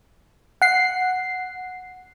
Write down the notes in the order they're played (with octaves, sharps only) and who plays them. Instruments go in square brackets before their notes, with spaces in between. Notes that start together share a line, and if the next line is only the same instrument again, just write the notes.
[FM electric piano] F#5 C7